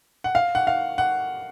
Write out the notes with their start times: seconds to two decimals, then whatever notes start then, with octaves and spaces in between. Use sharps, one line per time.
0.24 F#5
0.35 F5
0.55 F#5
0.67 F5
0.98 F#5